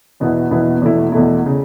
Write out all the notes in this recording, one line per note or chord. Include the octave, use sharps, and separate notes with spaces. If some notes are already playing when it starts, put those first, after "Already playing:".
E2 B2 B3 E4
E2 B2 B3 E4
E2 B2 A3 E4
E2 B2 A3 E4
C#3